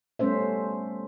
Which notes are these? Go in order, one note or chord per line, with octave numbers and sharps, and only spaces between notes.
G3 A3 B3 C#4 C5 E5